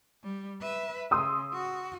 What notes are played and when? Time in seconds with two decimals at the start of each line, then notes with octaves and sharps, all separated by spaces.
0.23 G3
0.61 B4 E5
1.11 C#3 C6 D#6 E6
1.53 F#4